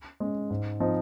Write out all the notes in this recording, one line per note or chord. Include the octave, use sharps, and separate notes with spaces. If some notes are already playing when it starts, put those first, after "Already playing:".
G#3 C#4
G#2
F3 C4 D#4